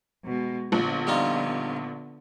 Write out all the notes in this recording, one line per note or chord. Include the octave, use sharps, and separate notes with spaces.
B2 G#3
A#1 D3 B3
G3 D#4 F4